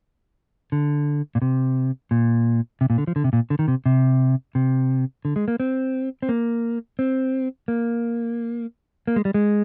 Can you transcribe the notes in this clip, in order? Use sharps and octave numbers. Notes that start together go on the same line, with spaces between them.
D3
A#2
C3
A#2
C3
A#2
D3
F3
D3
C3
A#2
D3
D#3
C3
C3
C3
D3
G#3
A#3
C4
C4
A#3
C4
A#3
A#3
G#3
G3
G#3